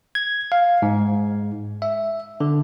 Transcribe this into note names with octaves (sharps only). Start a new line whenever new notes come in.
G#6
F5
G#2
E5
D3